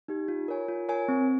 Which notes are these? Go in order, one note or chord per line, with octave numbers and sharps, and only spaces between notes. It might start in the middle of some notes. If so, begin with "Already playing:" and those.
D#4 G4
F4
A#4 C#5 G#5
F4
A#4 C#5 G#5
C4